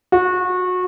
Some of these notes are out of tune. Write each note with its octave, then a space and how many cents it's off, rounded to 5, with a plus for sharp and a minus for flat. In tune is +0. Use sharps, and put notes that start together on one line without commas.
F#4 -25